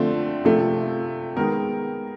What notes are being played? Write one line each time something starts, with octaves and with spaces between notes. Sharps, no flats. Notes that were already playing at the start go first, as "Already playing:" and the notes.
Already playing: D3 F3 A3 C4
C3 F3 A3
D#3 G#3 B3 A#4